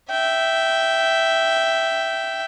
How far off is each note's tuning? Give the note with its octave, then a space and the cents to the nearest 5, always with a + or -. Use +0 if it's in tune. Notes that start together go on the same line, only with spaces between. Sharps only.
E5 +0 G5 -10